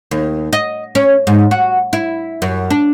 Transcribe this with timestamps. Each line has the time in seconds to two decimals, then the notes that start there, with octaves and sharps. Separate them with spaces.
0.11 D#2
0.53 D#5
0.95 C#4
1.27 G#2
1.51 F#4
1.93 E4
2.42 F#2
2.71 D4